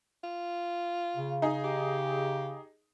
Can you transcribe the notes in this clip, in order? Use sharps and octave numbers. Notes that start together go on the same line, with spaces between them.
F4
C#3
D#4 G#4
G4